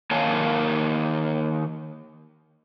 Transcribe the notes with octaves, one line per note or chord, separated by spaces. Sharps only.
D#3 A#3 C#5 F5 G#5 A5